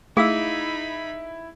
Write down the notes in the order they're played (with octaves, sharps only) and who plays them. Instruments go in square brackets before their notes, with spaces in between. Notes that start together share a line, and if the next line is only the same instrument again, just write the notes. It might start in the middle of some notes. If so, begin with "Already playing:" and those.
[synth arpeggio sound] A3 [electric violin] D#4 B5 [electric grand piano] E4 [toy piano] G#4 F5 E6